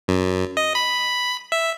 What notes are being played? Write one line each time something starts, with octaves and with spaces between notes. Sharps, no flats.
F#2
D#5
B5
E5